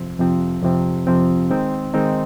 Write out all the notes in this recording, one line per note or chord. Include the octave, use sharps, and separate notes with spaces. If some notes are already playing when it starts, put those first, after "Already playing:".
Already playing: F2 C3 F3 C4
F2 C3 F3 C4
F2 C3 F3 C4
F2 C3 F3 C4
D#3 G#3 C4 D#4
D#3 G#3 C4 D#4